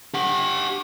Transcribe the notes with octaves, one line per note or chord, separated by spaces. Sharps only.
G4 F#5